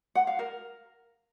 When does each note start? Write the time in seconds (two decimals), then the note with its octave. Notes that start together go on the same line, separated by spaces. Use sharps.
0.15 F#5
0.27 F5
0.39 A#4